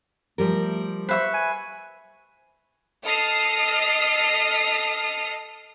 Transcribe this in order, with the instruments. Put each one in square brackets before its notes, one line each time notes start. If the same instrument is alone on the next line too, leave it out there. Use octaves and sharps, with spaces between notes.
[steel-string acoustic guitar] F3 G3 A#4 [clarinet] A3
[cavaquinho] B4 E5 C#6 [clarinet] C5
[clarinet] G#5
[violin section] A4 D#5 D#6 F6 C7